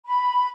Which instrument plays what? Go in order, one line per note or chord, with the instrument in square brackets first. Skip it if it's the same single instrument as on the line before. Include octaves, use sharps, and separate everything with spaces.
[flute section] B5